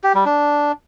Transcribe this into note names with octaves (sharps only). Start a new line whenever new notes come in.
G4
G3
D4